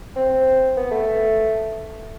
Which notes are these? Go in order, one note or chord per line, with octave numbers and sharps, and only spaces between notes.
C4
B3
A3